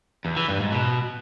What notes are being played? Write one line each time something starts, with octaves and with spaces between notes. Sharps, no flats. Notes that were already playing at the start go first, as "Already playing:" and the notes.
E2
E3
G2
G#2
B2